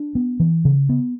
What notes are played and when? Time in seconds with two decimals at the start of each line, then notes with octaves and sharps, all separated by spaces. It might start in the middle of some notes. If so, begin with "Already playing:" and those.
Already playing: D4
0.15 B3
0.40 E3
0.65 C#3
0.89 B3